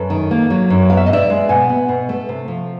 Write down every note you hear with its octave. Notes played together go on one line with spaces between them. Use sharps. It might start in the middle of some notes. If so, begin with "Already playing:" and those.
Already playing: F#2 A4 B4
D#3
A#3
F#3
F#2
B3 F5
E5
D#5
B2 D5 E5
G#3
B2 F#5 G#5
B3
B2
A3
C3
F3